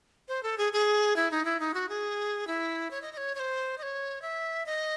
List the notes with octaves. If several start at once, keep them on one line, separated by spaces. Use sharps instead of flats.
C5
A4
G#4
G#4
E4
D#4
E4
D#4
F#4
G#4
E4
C#5
D#5
D#5
C#5
C#5
C5
D#5
C#5
E5
D#5